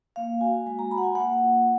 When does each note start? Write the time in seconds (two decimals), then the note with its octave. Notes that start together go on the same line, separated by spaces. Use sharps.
0.16 A#3 F5
0.41 F#4 G#5
0.66 G#3 G#5
0.79 A#5
0.91 F#4 B5
0.98 F#5
1.04 G#5
1.15 A#3 F#5
1.40 F4